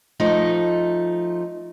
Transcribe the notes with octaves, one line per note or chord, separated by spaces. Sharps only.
F3 A3 D#4